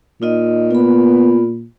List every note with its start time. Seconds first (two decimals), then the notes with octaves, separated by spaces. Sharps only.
0.22 A#2 D#4 F4 D#5
0.71 B3 F4 B5